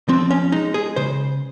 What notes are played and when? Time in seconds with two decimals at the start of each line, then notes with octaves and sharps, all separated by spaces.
0.09 F3 C4
0.31 C#4
0.52 G#3 D#4
0.74 G#4
0.96 C#3 C5